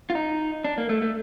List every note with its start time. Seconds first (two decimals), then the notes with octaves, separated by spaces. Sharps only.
0.10 F4
0.15 D#4
0.65 D4
0.78 A#3
0.89 A3
1.02 A3